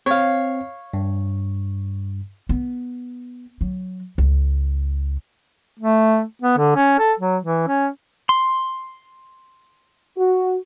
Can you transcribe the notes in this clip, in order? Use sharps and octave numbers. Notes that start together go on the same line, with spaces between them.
C4 C#5 F5
G2
B3
F#3
C#2
A3
B3
D3
C#4
A4
F#3
E3
C#4
C6
F#4